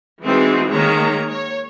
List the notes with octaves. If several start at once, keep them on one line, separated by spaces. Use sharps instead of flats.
E3 G#3 B3 C4 D#4 F#4
D#3 G#3 A#3 C#5 A#5
C#5